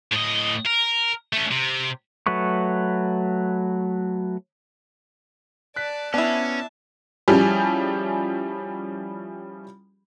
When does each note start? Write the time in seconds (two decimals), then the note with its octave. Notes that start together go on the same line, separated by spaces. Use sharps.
0.12 A2 D#5
0.66 A#4
1.33 A3 C#4
1.51 C3
2.27 F#3 A3 B4 C#6
5.76 D5 A5 F#6 B6
6.14 B3 C#4 D4 E4 E5 A5
7.28 F3 G3 C#4 E4 G4 G#4